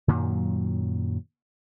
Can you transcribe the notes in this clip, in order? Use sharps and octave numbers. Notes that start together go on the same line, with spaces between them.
F#2 A#2 D#3 F#3